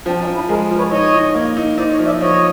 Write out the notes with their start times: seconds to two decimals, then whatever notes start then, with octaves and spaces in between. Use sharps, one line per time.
0.06 F3 C4 D4
0.20 C#4 D#4
0.27 F3
0.34 D4 E4
0.49 G#3 G#4 A#4
0.71 F3
0.77 B4 C#5
0.91 D#4 C#5 D#5
1.14 D#4
1.35 A#3
1.57 D#4
1.78 D#4 C5 D5
1.92 C#5 D#5
1.99 F3
2.06 D5 E5
2.20 F3 C#5 D#5